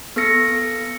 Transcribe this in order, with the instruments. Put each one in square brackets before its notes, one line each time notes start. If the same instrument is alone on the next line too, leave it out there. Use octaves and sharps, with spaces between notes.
[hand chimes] B3 A4 E6 A#6 C#7